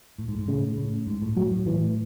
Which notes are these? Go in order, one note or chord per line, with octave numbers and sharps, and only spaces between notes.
A2
G#2
G#2
A2 C#3
A2
G#2
A2
A2 F#3
A2
A2 E3